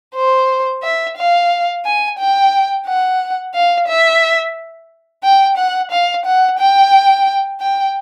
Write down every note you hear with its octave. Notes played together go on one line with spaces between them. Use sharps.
C5
E5
F5
G#5
G5
F#5
F5
E5
G5
F#5
F5
F#5
G5
G5